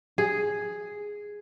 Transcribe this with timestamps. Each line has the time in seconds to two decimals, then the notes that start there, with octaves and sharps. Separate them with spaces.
0.18 G#4